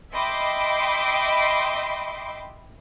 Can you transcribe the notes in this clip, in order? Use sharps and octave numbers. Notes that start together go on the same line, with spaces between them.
D#5 E5 G5 B5 C6 D6